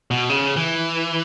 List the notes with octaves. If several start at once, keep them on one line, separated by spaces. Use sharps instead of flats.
B2
C#3
E3